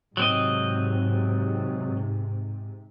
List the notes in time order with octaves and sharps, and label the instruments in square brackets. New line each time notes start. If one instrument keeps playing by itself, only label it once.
[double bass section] G#2 C3 [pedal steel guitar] F#3 C4 D#5